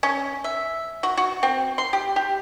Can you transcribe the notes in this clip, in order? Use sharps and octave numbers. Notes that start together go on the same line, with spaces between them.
C#4
E5
F#4
F#4
C4
C6
G4
G4